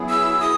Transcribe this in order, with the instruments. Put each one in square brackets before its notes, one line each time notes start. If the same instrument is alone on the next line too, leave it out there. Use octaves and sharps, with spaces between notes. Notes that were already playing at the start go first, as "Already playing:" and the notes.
Already playing: [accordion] F#3 B3 E4 G#4
[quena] E6
D#6